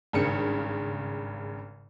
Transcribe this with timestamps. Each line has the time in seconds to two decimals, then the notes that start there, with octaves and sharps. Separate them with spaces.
0.13 G#1 G2 C#3 C#7